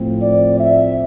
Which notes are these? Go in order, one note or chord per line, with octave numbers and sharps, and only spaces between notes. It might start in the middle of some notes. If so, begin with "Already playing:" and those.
Already playing: A2 F3 C4
D5
E5